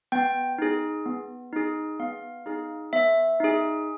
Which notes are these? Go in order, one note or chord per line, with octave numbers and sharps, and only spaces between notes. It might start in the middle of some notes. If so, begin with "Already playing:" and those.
B3 G5
D#4 G#4
B3
D#4 G#4
B3 F5
D#4 G#4
B3 E5
D#4 G#4